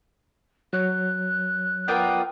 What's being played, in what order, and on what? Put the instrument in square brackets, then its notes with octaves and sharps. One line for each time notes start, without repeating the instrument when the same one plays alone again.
[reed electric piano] F#3 C#5 [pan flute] F#6
[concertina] B3 D5 D#6 [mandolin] F4 A#4 G5